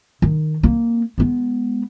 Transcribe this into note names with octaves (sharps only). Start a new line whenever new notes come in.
D#3
A#3 C4
G#3 B3